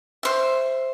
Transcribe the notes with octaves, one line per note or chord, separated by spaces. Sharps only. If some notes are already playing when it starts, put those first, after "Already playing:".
C5 E5